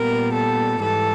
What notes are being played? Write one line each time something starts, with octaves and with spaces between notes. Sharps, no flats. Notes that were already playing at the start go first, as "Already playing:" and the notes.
Already playing: A#2 G3 B3 A#4
A4
G#2 E3 G3 A4